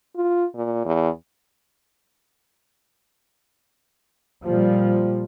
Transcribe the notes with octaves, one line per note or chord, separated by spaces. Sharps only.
F4
A#2
E2
A#2 F3 G3